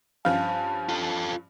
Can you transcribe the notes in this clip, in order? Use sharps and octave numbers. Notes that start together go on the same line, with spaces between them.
G2 F3 C#4 F5 A5
F4 A4